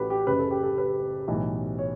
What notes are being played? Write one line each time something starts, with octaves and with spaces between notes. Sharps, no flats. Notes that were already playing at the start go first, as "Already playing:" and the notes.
Already playing: A1 A2 E3 F#4 G4 A4 B4
G4
F#1 F#2 C#3 B4
A4
G4
A4
B4
B1 A2 E3
C#5